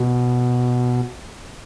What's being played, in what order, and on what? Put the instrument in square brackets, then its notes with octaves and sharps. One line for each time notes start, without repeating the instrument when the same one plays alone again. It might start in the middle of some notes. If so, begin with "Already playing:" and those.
Already playing: [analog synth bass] B2